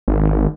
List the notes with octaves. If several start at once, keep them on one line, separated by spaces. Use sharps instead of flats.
G#1